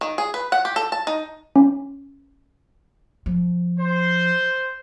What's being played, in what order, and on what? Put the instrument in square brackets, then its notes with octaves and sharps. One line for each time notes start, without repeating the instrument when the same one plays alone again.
[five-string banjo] D#3
G#4
B4
F#5
G4
A4
A5
D#4
[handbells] C#4
[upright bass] F3
[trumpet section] C5